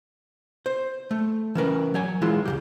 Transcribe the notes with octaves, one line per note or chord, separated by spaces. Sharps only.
C5
A3
E3 C#4 A#4 B4
F#3 C#5 G#5
E3 G#3 E4 F4
C#2 C3 G4